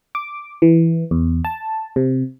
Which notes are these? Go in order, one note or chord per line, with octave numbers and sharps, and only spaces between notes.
D6
E3
E2
A5
C3